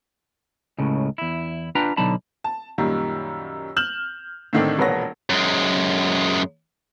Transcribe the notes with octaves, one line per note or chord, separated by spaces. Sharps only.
C#2 A2 C#3
E2 E4
D4 F4 B4 G5 A#5
B2 D3 F#3 D#4 A5 B5
A5
F#2 A#2 D#3 G3
F6 G6 E7 F#7
A2 D3 D#3 A3 C4 D4
E1 A#1 B4 C#5 A#6
F#2 G#3